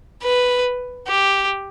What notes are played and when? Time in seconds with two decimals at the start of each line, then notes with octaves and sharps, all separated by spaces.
0.22 B4
1.08 G4